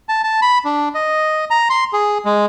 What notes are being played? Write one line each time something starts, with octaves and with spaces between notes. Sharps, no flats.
A5
A5
B5
D4
D#5
A#5
C6
G#4
G#3